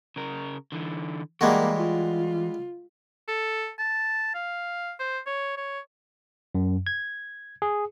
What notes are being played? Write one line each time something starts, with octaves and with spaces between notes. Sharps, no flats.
C#3 A#4
D3 E3
E3 G3 G#3 A#3 F#4
F4
A4
A5
F5
C5
C#5
C#5
F#2
G#6
G#4